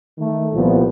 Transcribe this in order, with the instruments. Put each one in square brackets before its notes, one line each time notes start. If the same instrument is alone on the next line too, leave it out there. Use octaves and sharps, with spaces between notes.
[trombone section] D#3 A3
C2 A#2 F3 B3